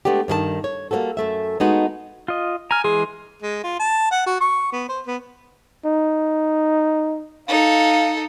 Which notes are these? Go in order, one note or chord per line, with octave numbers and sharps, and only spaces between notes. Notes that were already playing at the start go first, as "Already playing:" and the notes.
G#3 A3 B3 D4 G4
G2 D#3 A4 A5
C#5
G3 A#3 C#4 F#4 A4
F#2 A3 E5
G#3 A3 B3 D#4 F#4
F4 D#5
G#5 A#5 F6
E3 G#3 G#4 C6
G#3
F4
A5
F#5
F#4
C#6
B3
C5
B3
D#4
D#4 A4 F5